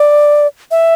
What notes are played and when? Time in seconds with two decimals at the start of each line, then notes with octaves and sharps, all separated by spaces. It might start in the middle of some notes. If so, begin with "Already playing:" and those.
Already playing: D5
0.71 E5